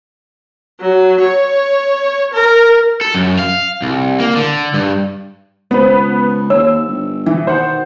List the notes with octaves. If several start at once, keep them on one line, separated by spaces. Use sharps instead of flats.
F#3
C#5
A#4
A4
F#2
F5
C2
A#3
D3
G2
C#2 D#3 F3 B3 C4 B4
D#2 C#5 E6
G1
B2 E3
D#3 C5 F#5